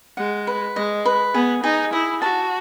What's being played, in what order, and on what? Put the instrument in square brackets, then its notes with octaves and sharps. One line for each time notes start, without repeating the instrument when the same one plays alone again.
[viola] G#3 [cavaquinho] F#5
[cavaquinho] B4
[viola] G#3 [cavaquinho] D#5
[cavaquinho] B4
[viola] B3 [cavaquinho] G#4
[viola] D#4 [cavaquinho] G#4
[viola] E4 [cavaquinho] D#6
[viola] F#4 [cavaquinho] A5